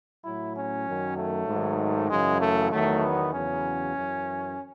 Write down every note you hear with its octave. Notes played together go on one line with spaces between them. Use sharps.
A2 F#3 E4
C#4
F#2 D#3 F#3
A3
G#2 D#3 F#3
F#2 C#3 E3 G#3
A3
E2 D#3 F#3 A3
B3
E2 C#3 F#3 C#4
F#2 E3